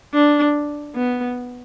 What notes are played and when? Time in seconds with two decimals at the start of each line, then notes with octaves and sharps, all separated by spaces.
0.14 D4
0.95 B3